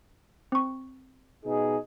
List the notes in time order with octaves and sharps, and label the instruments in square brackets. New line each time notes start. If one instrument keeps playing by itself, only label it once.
[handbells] C4 C#6
[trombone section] B2 D#4 G#4